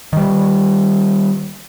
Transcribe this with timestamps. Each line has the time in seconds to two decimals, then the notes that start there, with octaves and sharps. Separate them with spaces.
0.13 D#3 G3